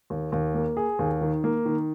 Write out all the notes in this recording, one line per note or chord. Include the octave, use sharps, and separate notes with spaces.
D#2
D#2
A#3
G#4
D#2
D#3
A#3
D#3